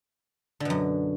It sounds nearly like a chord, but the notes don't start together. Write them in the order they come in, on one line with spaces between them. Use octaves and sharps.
D3 B2 F#2